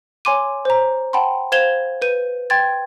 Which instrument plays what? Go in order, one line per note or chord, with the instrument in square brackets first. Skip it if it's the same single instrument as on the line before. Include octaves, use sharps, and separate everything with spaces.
[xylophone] C#5 G#5 C6 D6 D#7
C5 A#5
F#5 G5 A5 B5 C6
C5 F5 G#6 E7 F7 G7
B4 G6 D#7
G5 C6 G#6 A6